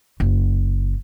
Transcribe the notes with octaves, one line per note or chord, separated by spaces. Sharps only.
F#1